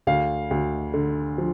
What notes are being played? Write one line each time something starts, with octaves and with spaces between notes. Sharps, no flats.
D2 F5
D2
D3
F3